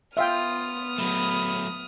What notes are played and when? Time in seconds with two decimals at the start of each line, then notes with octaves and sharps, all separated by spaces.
0.17 B3 F4 E5 F5 G5 D#6 F6
0.98 F#3 A3 B5